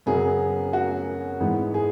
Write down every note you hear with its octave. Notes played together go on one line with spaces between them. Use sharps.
F#2 C#3 F#3 B3 G#4
F#4
G#2 E3 B3
G#4